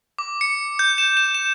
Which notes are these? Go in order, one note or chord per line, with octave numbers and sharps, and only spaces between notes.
D6
C#7
G6
E7
E7
E7